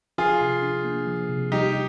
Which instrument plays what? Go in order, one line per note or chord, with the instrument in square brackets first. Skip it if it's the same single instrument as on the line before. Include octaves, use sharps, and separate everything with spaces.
[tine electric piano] F3 [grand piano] F4 G#4
[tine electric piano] C3
D4
A#3
F3
C3
[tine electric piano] G3 [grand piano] D#4 G4